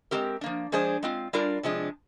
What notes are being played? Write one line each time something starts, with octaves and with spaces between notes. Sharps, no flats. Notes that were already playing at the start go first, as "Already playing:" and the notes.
G#3 C4 G4 A#4
F3 A#3 D4
F3 G#3 D4 G#4 C5
G#3 C4 F4
G3 D4 F4 A#4 D5
C3 F3 G#3 D4